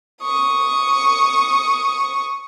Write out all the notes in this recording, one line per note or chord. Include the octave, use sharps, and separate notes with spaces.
C#6 D#6